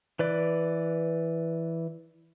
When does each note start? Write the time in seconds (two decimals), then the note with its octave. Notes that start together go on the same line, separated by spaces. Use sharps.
0.19 E3 B4 D5